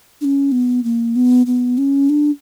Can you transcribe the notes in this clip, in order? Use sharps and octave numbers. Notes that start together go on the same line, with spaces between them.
D4
C#4
B3
A#3
B3
B3
C#4
D4